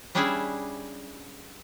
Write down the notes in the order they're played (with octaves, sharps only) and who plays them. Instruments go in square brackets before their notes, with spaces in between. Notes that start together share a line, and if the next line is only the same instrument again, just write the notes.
[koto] G3 C#4 D4 E4 G#4 E5